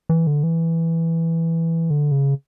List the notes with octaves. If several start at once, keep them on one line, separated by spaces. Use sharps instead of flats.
E3
D3
E3
D3
C#3